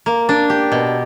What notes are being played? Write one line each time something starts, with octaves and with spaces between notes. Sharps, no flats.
A#3
D4
G4
B2